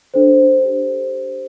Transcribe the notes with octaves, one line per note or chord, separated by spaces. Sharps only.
D4 A4 C5
G4 C5